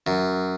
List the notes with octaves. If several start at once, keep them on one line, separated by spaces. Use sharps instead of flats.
F#2